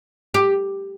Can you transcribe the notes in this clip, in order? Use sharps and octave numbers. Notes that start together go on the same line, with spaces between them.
G4